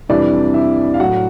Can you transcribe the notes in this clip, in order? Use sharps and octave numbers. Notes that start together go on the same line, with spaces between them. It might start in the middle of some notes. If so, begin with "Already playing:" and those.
F2 C3 E3 G3 D4 D5
E4 E5
F5
A2 F#3 F#4 F#5